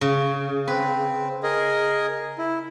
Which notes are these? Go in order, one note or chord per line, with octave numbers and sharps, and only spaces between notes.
C#3
C4 B4
G#4 A#4 D#5
E4